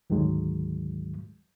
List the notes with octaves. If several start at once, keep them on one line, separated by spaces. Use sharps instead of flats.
D2 G#2 D#3 F#3 G#3